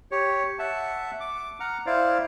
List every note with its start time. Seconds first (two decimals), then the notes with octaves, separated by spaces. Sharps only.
0.11 G4 C#5
0.59 E5 F#5 A5
1.20 D6
1.60 F#5 A#5 F6
1.86 E4 C5 D5 F5